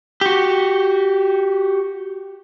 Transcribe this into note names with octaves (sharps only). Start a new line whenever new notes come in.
F#4 G4